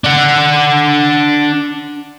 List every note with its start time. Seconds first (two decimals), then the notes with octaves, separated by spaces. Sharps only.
0.04 D4 F#5